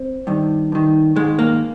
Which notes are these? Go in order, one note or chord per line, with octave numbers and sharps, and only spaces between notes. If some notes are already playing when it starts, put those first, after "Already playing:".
Already playing: C4
G2 D#3
G2 D#3
G#2 D#3 G#3
A#3